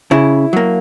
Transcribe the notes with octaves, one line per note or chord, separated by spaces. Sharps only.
C#3 E4
F#3 A#3